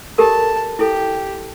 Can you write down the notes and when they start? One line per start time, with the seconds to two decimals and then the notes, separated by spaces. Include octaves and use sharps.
0.18 G4 A4 A#4 A5
0.79 E4 G4 A4